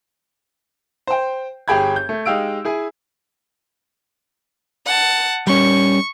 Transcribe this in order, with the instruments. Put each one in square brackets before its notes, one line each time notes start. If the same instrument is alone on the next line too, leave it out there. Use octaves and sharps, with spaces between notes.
[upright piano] C5 G5
G1 G4 G#4 G5 B5 G#6
G6
A3
G#3 D#4 G4 F5 E6 D7
E4 G#4 G#5
[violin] F#5 A5
[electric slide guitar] G3 C#4 [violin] C#6